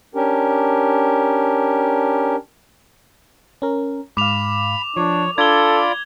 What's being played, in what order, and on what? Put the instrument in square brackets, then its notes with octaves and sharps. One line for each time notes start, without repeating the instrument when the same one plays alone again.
[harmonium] C#4 D4 G4 A#4
[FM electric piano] C#4 A#4
[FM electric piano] G#2 F5 [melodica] B5 [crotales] D6 F7
[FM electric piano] F3 [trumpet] D4 [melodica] C#5
[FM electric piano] D4 [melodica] F4 D5 B5 [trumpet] A4 [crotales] G#6 G7